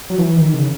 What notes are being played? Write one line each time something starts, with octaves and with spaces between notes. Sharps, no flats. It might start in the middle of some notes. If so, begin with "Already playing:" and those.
F#3
E3
D#3
C#3